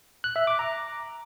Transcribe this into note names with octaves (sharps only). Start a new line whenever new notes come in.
F#6
E5
D6
A#5